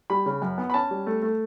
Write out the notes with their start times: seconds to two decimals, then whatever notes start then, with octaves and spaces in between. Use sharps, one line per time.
0.10 G3 B5
0.26 C#3
0.42 F#2
0.58 B3
0.70 B5
0.74 C#4 A5
0.91 G3
1.07 A3
1.22 A3